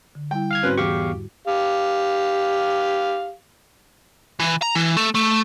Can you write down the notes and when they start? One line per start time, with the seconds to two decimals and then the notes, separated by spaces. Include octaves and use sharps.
0.15 D3
0.31 G3 E4 G5
0.51 F5 F6 G#6
0.63 G#2 C4 C#4 F#4 B4 F#6
0.78 E2 G4 F5 C#6
1.47 G4 F5
4.40 E3
4.62 A#5
4.75 E3
4.97 A3
5.15 A3